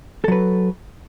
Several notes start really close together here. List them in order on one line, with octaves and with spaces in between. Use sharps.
A4 F#3 B4